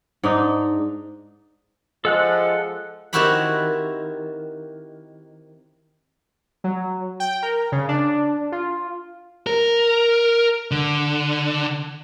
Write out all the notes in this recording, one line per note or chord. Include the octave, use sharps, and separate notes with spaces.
G#2 D4 D#4
F3 G#3 A4 F#5 F#6
D#3 C4 E4 F#4 G4 B5
F#3
G5
A#4
C#3
D4
F4
A#4
D3